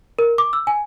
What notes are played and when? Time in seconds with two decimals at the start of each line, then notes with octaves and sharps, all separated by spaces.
0.19 A#4
0.38 D6
0.53 E6
0.67 G#5